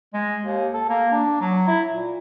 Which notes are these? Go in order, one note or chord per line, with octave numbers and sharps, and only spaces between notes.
G#3
D#2
A4
A#3
D4
F#3
E4
A#2